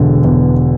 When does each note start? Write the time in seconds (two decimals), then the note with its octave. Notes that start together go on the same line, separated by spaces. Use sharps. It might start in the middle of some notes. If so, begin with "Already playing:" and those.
Already playing: E1 D3
0.24 E2